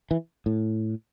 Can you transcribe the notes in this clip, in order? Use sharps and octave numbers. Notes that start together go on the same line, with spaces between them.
E3
A2